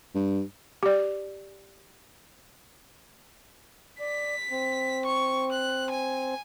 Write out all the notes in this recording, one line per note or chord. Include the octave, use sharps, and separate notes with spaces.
G2
G4 D5
D5 B6
C4
C#6
F#6
G#5